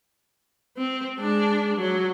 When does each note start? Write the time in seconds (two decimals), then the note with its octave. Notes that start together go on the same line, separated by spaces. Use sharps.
0.77 C4
1.19 G#3 D4
1.77 F#3